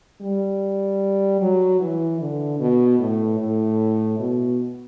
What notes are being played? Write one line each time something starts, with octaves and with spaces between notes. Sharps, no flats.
G3
F#3
E3
D3
B2
A2
A2
B2